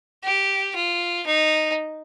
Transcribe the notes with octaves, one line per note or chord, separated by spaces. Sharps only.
G4
F4
D#4